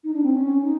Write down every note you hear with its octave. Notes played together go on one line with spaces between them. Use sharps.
D#4
D4
C4
C#4
D#4